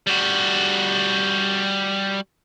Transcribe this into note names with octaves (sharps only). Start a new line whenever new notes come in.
G3 F#4